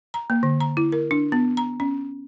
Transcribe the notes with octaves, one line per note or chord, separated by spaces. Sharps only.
A#5
A#3
D3
A#5
E4
A#4
D4
B3
A#5
C#4